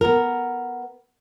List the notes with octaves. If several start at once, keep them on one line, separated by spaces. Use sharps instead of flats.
B3 A#4